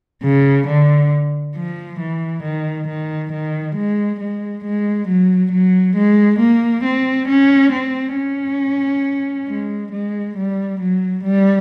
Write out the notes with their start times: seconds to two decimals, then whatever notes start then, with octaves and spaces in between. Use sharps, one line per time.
0.24 C#3
0.67 D3
1.56 F3
1.99 E3
2.43 D#3
2.88 D#3
3.33 D#3
3.76 G#3
4.20 G#3
4.65 G#3
5.08 F#3
5.52 F#3
5.96 G#3
6.40 A#3
6.84 C4
7.28 C#4
7.73 C4
8.16 C#4
9.48 G#3
9.92 G#3
10.37 G3
10.80 F#3
11.24 G3